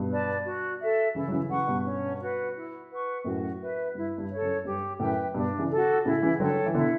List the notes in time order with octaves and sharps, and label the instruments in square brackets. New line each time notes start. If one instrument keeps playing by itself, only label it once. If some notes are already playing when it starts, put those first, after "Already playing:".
Already playing: [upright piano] G2 B2
[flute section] B4 D5 A5
F#4
A4 E5
[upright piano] C#3 E3 [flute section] E4
[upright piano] F#3
C#3 E3
[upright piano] C#3 E3 [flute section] B4 F#5 C#6
[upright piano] G2 B2
[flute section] C#4
F#4 B4 F#5
E4
B4 F#5 C#6
[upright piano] F#2 A2 [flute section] F#4
[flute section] B4 E5
[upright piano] G2 [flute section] E4
[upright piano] G2
[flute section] A4 C#5
[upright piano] F#2
[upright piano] G2 [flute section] G4
[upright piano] F#2 A2 [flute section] B4 E5 G5
[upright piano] G2 B2 [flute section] D4
[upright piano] C#3 E3
[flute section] F#4 A4
[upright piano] A2 C#3 [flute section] E4
[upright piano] C#3 E3
[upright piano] D3 F#3 [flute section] A4 C#5 G5
[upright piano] E3
[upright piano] B2 D3 [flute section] E4